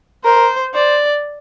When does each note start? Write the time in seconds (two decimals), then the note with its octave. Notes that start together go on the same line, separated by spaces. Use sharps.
0.25 A#4 C5
0.74 C5 D5